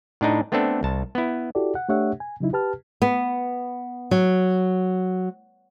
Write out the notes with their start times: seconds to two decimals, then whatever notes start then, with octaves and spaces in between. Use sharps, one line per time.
0.21 A2 D4 D#4
0.52 A3 B3 C4 D4 A4
0.83 C2 A5
1.15 B3 E4
1.55 E4 F#4 G4 A4 D5
1.75 F#5
1.89 A3 D4 G4 C#5 E5 F#5
2.20 G#5
2.40 C#3 F#3 D#4 E4
2.53 G4 B4 A5 F6
3.02 B3
4.11 F#3